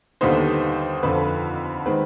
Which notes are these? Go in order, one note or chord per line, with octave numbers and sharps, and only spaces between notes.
D#2 D3 G3 B3 D#4 C5
F2 D3 F3 B4
D#3 G#3 C4 B4